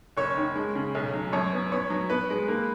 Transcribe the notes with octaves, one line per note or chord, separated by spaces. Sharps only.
F#1 C#5 C#6
D#3
G#3
C#3
B1
F#3
F#2 C#5 C#6
B3
B3 C#5 C#6
F#3
B3 B4 B5
G#3
A#3